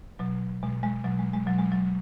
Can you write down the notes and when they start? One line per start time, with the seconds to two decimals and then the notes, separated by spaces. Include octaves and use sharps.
0.19 B2 F#3
0.63 B2 G#3
0.83 G#3
1.04 B2 F#3
1.19 G#3
1.33 G#3
1.46 B2 F#3
1.59 G#3
1.72 F#3